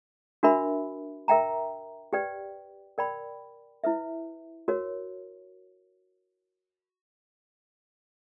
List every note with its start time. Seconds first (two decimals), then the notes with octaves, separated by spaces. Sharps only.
0.43 D4 F#4 A#4 E5 B5
1.28 A#4 E5 G5 A#5
2.13 G4 B4 D5 G5
2.98 A#4 D5 G5 B5
3.84 E4 B4 E5
4.68 F#4 A#4 C#5